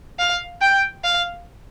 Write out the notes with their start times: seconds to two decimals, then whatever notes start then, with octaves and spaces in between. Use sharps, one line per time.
0.19 F5
0.61 G5
1.04 F5